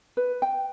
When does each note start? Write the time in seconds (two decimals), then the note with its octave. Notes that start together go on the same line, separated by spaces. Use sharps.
0.17 B4
0.42 G5